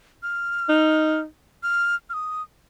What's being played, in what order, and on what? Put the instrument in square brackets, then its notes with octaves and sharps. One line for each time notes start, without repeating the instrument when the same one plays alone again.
[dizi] F6
[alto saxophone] D#4
[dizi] F6
F6
D#6